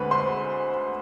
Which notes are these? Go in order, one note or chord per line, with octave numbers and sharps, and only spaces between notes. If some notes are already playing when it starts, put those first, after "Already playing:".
Already playing: D2 D3 G#3 C4 B4 B5
C5 C6